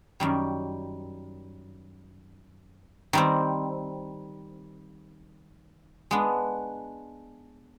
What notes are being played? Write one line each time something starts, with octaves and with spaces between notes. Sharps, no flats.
F#2 D#3 G3
D#3 G3 C4
G#3 B3 D4